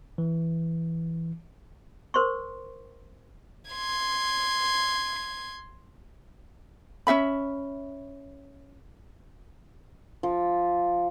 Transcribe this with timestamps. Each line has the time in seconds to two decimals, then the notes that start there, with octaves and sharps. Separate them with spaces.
0.18 E3
2.14 A#4 C5 C6 C#6
3.71 C6 G#6
7.07 C#4 F#4 E5 B5
10.23 F3